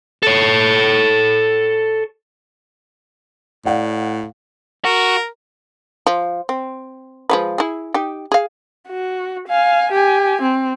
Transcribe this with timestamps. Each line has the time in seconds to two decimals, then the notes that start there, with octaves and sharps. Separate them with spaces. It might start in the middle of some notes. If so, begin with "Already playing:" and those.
0.23 A4 C#5
3.65 A2 D5 F5 F#5
4.85 F#4 A#4
6.07 F3
6.49 C4
7.30 F3 G#3 B4
7.58 E4 G#4
7.94 D#4 G4
8.32 G#4 F5
8.88 F#4
9.48 F5 G#5
9.92 G4 G#5
10.42 C4